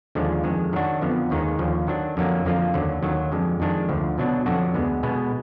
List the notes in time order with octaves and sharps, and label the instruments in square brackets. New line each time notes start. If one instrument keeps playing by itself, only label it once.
[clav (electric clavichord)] D#2 D3 F3 G#3 D4
F2 D#3 G#3
D#3 F#3 D4 F#4
F2 D3 F3 B3
D#2 D#3 G#3 D#4
D#2 D3 F3
D#3 F#3 D4
F2 D3 F#3 A#3
F2 D3 F3 A#3 F4
D#2 D3 F#3
D#2 D#3 F#3
F2 D3 G#3
F2 D#3 G#3 D4
D2 D3 F3
B2 F#3 D4
F2 D3 F#3 D4 F#4
D2 D3 G#3 B3
B2 G#3 B3